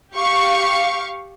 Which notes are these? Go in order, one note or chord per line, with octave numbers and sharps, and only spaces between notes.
G4 F5 C#6